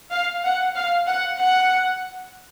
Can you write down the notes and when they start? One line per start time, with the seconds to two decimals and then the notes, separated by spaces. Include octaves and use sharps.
0.11 F5
0.44 F#5
0.75 F5
1.07 F#5
1.38 F#5